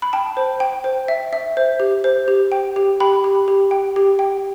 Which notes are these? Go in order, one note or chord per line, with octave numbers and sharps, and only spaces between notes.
B5
G5 A5
C5
G5
C5
E5
E5
C5
G4
C5
G4
G5
G4
G4 G5 B5
G4
G4
G5
G4
G5